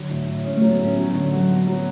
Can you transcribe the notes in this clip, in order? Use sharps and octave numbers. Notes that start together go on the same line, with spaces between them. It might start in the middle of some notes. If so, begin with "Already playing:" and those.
Already playing: D3 F#3
A2
A2
G#3 C#4
A3
F#3
B3
A2
C#4
F#3 C#4
A3
D3
F#3 F#4
F#3 B3
F#3